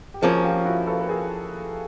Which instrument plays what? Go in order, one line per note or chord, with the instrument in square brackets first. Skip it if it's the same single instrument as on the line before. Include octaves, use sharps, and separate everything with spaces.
[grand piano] G4
[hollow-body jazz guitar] F3 A#3 C#4 [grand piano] F#4 G#4
[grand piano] F4 G4
E4 F#4
A4 B4
B4
G#4 A#4